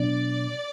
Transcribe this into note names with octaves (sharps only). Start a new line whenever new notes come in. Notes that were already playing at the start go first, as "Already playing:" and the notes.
Already playing: B2 F#3 B3 D4 D5